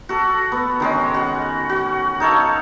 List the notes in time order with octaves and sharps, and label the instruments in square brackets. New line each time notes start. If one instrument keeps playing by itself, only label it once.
[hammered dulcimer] F#4 A4
B3
D#3 G#3 C#4
F#4
F#4
D#4 A4 C#5 F5